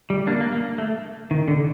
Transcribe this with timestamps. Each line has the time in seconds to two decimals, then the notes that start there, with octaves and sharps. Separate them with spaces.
0.10 G3
0.27 A#3 D4
0.41 A#3
0.52 A#3
0.78 A3
1.31 D#3
1.48 D3